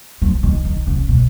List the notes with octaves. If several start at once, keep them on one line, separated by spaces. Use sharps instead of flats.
F3
D#3
D#3
C#3
B2